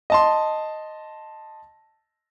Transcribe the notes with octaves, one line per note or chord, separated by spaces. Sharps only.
D#5 A5 C6